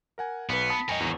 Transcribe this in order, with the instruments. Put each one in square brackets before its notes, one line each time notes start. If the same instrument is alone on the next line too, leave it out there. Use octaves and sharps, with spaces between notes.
[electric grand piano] A#4 F#5 G#5
[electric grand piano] B1 B4 [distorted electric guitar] B3
[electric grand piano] A5 B5 D#6
[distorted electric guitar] A#4 C#5 [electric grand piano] D#5 G5 G#5
[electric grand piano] G#1 E2